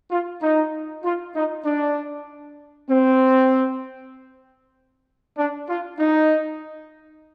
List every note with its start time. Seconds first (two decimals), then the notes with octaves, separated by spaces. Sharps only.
0.11 F4
0.42 D#4
1.04 F4
1.35 D#4
1.65 D4
2.90 C4
5.37 D4
5.69 F4
5.99 D#4